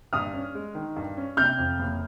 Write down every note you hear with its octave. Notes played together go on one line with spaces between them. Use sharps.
G2 D#6 F6
C#4
G#3
D#3
G2
C#4
C3 F6 G6
F2
F#1